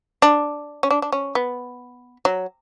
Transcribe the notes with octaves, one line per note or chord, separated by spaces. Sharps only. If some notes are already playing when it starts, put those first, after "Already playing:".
D4
C#4
D4
D4
C#4
B3
F#3